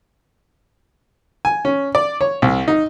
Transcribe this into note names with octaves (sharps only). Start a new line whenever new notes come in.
G#5
C#4
D5
C#5
C2
D#4